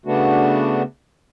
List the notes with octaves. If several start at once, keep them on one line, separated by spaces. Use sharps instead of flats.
C#3 A3 B3 D4 F#4